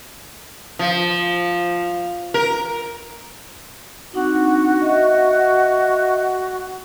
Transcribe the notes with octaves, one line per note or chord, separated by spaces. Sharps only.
F3
A#4
C4 D4 D#4 F#4
D#5 E5 F#5